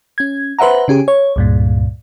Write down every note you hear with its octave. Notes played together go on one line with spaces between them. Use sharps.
C#4 G#6
B4 C5 E5 F#5 A#5
C#3 C#4 G4 G#4
C#5
C#2 G2 A#2